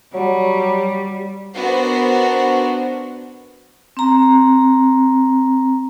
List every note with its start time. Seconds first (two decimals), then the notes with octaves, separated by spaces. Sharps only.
0.14 F#3 G3
1.56 B3 D4 F#4 A#4 C5
3.97 C4 A#5